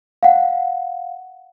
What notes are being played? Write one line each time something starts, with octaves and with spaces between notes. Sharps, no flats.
F5 F#5